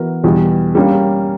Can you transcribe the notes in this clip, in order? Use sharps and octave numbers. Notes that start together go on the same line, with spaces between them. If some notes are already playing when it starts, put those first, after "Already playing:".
Already playing: E3 B3 F#4 A#4
E2 B2 G3
G3 A#3 C#4